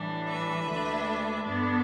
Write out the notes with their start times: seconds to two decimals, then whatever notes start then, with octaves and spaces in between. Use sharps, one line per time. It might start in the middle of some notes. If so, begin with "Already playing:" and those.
Already playing: A2 E3 G3 D4
0.28 B4 E5
0.67 D2 D3 A3 D4
1.44 G2 D3 B3 D4